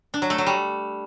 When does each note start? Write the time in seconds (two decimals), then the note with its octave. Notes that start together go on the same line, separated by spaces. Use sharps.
0.14 D4
0.22 F#3
0.30 A3
0.38 F#3
0.46 G3